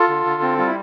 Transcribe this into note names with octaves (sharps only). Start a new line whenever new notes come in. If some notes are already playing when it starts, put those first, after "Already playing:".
Already playing: F4 A4
D3
D3
C4
G3 F4
E4